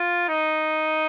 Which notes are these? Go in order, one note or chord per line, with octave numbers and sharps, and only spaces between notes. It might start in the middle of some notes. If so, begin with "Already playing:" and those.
Already playing: F4
D#4